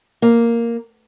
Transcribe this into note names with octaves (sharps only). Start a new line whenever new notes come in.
A#3